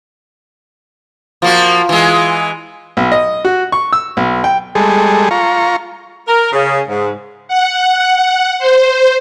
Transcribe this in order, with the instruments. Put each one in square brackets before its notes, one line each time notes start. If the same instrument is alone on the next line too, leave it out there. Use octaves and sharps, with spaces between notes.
[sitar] F3 A#3 F#4 [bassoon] F4
[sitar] E3 G#3
[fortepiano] B1
D#5
F#4
C#6
E6
B1
G5
[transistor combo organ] G3 G#3 G#4 A4
F4 A#5 C#6
[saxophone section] A#4
C#3
G#2
[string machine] F#5
C5